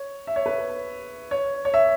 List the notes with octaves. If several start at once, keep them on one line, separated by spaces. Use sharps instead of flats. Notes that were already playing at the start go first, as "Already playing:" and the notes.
Already playing: C#5
E5
C#5
B4
C#5
C#5
E5